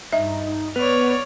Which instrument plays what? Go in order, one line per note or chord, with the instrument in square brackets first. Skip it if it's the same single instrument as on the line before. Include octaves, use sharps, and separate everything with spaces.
[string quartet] G2 [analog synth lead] D#4 [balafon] E5
[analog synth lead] B3 [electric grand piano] B4 [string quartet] C#5 D5 F6